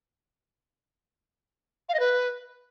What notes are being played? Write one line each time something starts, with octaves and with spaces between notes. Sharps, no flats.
F5
D#5
B4